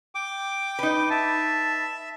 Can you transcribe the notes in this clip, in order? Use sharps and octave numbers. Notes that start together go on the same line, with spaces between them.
G5 D6
D#4 B4
E5 A5